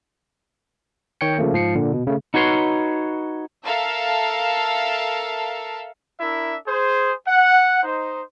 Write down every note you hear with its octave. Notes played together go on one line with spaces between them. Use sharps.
D#3 C#5 G5 G6 C#7
C#3 F3 A3 A#3
G#2 F3 C7 C#7
A#2 D3
B2
C#3 A3
D#4 F#4 B4 C#5 C6
A4 A#4 E5 F5 A5
D4 E4 A#4 E5
G#4 C5
F#5
D#4 C5